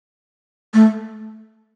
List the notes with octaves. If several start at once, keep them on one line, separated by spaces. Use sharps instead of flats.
A3